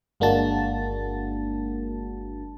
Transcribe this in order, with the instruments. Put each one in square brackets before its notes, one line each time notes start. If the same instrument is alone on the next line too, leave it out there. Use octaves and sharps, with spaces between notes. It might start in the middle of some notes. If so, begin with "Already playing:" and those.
[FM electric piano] G1 G#3 A#3 D4 F#4 A5